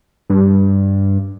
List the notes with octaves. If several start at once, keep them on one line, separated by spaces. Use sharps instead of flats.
G2